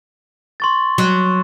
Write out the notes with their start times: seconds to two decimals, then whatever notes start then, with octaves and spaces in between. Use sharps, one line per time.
0.60 C6 C#6 A6
0.98 F#3